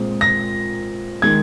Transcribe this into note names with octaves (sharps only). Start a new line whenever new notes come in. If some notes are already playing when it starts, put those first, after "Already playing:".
Already playing: A#2 G#3 C4
A#6
D#3 G#3 G#6